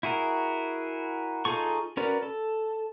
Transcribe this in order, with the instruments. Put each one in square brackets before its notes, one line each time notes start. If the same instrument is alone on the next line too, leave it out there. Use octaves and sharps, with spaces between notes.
[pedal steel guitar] E4 F#4 G#4 A#4
D#4 F4 G#4 A4 C#6
C#4 F#4 A#4 B4 D5
A4